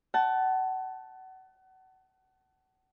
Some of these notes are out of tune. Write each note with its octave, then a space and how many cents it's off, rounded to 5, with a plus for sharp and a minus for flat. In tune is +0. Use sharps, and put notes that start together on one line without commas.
F#5 +30 A5 -5